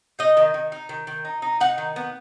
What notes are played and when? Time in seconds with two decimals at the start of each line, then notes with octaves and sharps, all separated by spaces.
0.19 D#4 D#5
0.37 D#3
0.54 D#3
0.72 D#4
0.89 D#3
1.07 D#3
1.25 D#4
1.42 D#4
1.60 D#4 F#5
1.78 D#3
1.96 B3